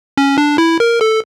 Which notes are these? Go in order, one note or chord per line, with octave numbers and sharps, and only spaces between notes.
C#4
D4
E4
A#4
A4